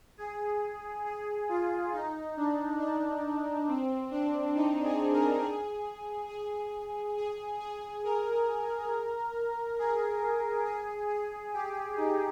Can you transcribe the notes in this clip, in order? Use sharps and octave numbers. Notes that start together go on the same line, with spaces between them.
G#4
G#4
F4
D#4
D4
D4
C4
D4
D#4
G#4
A#4
G#4
G#4
G#4
G#4
A#4
G#4
G#4
G#4
G4
D#4